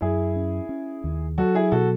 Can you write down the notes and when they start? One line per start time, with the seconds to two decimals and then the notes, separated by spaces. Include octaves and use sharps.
0.01 F#2 E4 G#4
0.36 C#4
0.69 C#4
1.04 D#2
1.38 F#3 F#4 A4
1.55 E4 G#4
1.72 B2 F#4 A4